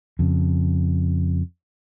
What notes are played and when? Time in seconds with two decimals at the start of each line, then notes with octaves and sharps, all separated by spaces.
0.19 F2 C#3